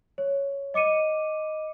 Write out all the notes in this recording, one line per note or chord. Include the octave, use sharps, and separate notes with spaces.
C#5
D#5 D6 C#7 D#7